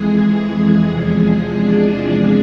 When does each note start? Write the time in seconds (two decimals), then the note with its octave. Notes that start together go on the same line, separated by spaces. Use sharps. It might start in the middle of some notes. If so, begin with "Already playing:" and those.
Already playing: F2 E3 G#3 G#4
0.90 E2 C3 F3 G#3 G#4
1.62 D4